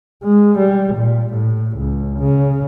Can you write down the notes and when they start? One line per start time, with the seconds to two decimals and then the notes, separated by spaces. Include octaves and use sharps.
0.23 G#3
0.58 G3
0.95 A#2
1.34 A2
1.78 C#2
2.20 C#3